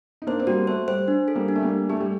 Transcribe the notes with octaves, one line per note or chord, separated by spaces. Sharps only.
D#4
A#3 D4 C5
C4
G3 A#3 F#4
A3 C5
G3 C5
D4
A4
G3 A#3
D4
A3
G3 A#3
D4
A3 G4
G3